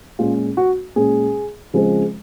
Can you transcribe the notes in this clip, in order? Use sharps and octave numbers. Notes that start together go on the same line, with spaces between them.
A#2 G#3 C#4 F4
F#4
A#2 G#3 C#4 G#4
C#3 F3 G#3 C4